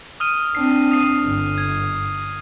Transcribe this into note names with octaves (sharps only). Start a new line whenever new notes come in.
D#6 F6 D#7
C4 D4 C7
D#6 C7 D#7
G1
G#6